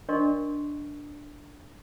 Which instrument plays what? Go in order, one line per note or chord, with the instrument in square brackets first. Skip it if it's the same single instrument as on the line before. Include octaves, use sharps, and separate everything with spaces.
[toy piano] D4 A#4 D5 D#5 C6 C#6